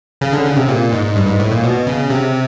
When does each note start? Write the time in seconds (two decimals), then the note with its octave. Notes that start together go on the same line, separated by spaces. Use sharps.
0.21 C#3
0.33 D3
0.45 C#3
0.57 C3
0.69 A#2
0.92 G#2
1.16 G2
1.27 G#2
1.40 A2
1.51 A#2
1.63 B2
1.87 C#3
2.10 C3